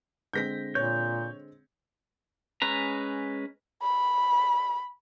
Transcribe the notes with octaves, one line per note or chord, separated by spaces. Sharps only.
D3 G#3 C4 G6 A#6 B6
A#2 C#5 G6
G#3 C#4 B4 A#5
B5